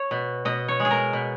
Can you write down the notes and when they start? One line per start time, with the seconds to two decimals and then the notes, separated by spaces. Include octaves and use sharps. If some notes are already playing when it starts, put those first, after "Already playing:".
Already playing: C#5
0.11 B2
0.45 B2 D#5
0.68 C#5
0.80 G#3
0.85 G#4
0.91 A#4
1.13 B2